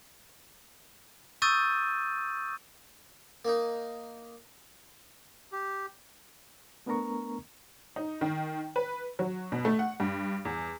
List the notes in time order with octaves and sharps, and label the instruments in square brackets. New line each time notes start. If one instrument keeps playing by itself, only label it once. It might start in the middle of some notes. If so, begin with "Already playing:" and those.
[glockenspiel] C#6 D#6 E6 G6 A6 D#7
[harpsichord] A#3 D#4
[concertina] G4
[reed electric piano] A3 B3 D4 A#4 A#5 C#6
[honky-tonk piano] D#4
D#3
B4
F#3
B2
A3
F#5
G2
E2